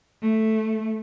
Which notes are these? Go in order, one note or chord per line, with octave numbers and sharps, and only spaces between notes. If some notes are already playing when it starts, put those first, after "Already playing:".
A3